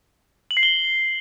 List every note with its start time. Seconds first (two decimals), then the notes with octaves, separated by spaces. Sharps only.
0.51 F#7
0.57 C7
0.63 G7